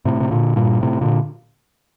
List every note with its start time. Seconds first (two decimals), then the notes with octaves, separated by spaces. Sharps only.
0.05 A2 C3
0.20 C3
0.31 A#2 D3
0.56 G2 A#2
0.82 A2 C3
1.01 A#2 D3